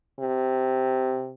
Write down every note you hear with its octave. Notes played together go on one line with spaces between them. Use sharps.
C3